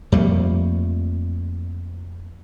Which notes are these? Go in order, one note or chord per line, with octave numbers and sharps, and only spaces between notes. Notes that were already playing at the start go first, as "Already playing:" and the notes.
F2 G3 A3 A#3